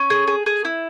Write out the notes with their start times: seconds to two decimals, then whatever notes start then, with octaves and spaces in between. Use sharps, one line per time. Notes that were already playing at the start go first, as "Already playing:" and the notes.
Already playing: C#4
0.10 G#4
0.27 G#4
0.46 G#4
0.65 E4